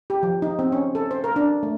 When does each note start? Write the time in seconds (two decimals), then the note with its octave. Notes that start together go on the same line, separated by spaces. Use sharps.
0.10 G4
0.23 F3
0.42 D#4
0.59 C4
0.72 C#4
0.95 A4
1.11 C5
1.24 A#4
1.36 D4
1.63 A3